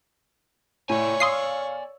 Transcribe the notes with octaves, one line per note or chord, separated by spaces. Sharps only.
A2 C#5 D5 G#5
F5 C6 D#6 E6 C7